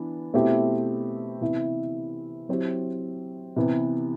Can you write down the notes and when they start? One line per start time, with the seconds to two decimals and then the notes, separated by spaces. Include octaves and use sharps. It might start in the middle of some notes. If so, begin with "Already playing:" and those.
Already playing: E3 B3 D4
0.34 B2 A3 C4 E4 G4
1.41 C3 E3 B3 E4
2.49 F#3 C4 E4 G4
3.56 C3 E3 B3